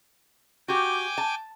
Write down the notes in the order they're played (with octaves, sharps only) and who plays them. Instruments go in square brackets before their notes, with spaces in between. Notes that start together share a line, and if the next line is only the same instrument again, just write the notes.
[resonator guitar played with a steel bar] F#4 G4 [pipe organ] G5 G#5 D6
[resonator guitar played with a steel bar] A5